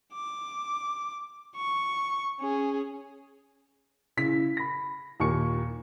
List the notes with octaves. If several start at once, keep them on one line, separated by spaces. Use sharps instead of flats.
D6
C#6
C#4 G#4
C#3 E4 B6
B5 A#6
D#2 A#2 C#6 C#7